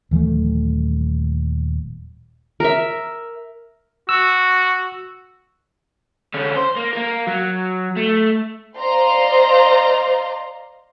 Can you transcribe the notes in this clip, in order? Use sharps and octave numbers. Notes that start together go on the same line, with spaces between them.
D#1 E3 F#3 A3
A#4 E5
F#4 E6
D3 C#4
C5
A#3
A#3 A#4
F#3
A3
C5 D5 D#5 F5 A#5 C6